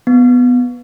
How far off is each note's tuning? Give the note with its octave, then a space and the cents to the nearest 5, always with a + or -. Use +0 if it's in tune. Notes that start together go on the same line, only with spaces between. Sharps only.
B3 +5